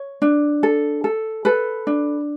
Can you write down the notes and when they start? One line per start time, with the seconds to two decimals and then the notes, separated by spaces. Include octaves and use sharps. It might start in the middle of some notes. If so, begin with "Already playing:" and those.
Already playing: C#5
0.22 D4
0.63 A4
1.04 A4
1.45 A4 B4
1.87 D4